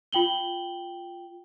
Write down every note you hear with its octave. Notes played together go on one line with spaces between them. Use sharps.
F4 G5 F#7 G7